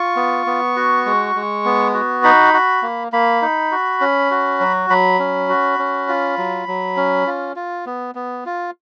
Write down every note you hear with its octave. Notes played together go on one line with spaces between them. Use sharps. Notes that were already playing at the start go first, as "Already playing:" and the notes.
Already playing: F4 C#6
B3
B3
F#4
G#3
G#3
B3
F#4
D#4 B5
F#4
A#3
A#3 B5
D#4
F#4
C#4
F#4
F#3
F#3 B5
C#4
F#4
C#4
F4
F#3
F#3
C#4
F4
F4
B3
B3
F4